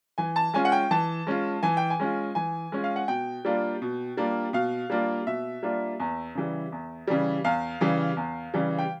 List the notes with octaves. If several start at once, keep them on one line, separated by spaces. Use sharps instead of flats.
E3 G#5
A5
G#3 C#4 F4 G#5
F#5
G5
E3 A5
G#3 C#4 F4
E3 G#5
G5
G#5
G#3 C#4 F4
E3 G#5
G#3 C#4 F4
F5
F#5
B2 G5
G3 A#3 D4 F4
B2
G3 A#3 D4 F4
B2 F5
G3 A#3 D4 F4
B2 E5
G3 A#3 D4 F4
E2
C#3 E3 G3
E2
C#3 E3 G3
E2 F5
C#3 E3 G3
E2
C#3 E3 G3
G5